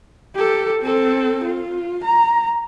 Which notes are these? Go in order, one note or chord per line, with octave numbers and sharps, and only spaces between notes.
G4 A4
C4 A4
F4
A#5